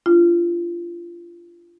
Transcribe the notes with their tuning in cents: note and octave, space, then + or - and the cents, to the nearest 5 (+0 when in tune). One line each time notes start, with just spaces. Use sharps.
D4 +0 F4 -25